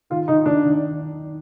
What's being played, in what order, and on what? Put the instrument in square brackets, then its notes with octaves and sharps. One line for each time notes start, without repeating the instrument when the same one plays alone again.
[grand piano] D#3 [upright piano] F4
[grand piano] D#3 [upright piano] D#4
[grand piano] D#3 [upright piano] D4
[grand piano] D#3